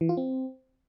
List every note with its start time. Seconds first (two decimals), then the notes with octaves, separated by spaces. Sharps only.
0.01 E3
0.09 F4
0.17 C4